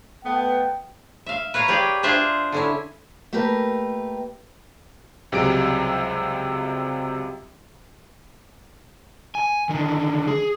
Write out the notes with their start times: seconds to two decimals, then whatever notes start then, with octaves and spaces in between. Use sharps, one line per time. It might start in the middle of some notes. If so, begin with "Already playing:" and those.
0.25 A3 B3 G5
1.26 E5 F5
1.54 B4 C#5 F5 A#5
1.68 G4 G#4 C#5 D5 F5
2.03 D4 F4 G#4 C5 E5 F5
2.52 D3 C#4 E4
3.33 A3 A#3 G4 A#4 B4
5.32 C#2 C3 F#3 G3 G#4 D7
9.35 G#5
9.69 D3 D#3
10.28 G#4